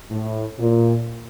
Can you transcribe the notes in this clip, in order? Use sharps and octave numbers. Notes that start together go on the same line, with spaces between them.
A2
A#2